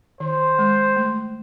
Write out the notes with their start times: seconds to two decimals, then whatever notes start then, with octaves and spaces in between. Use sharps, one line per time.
0.20 D#3 C5
0.58 G#3
0.96 A3